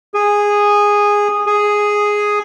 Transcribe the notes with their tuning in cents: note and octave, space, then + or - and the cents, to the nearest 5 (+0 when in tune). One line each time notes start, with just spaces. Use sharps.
G#4 -10
G#4 +0